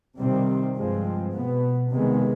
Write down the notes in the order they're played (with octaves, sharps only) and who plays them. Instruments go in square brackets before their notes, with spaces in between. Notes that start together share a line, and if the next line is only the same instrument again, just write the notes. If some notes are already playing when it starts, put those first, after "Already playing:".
[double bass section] C3 D#3 G3 C4
G2 F3 G#3 C4
B2 B3
C3 D#3 G#3 B3